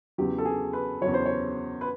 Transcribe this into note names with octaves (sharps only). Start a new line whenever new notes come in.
E2 C#3 F#3 G4
A4
G#4
B4
E2 C#3 F#3 C#5
C5
C#5
B4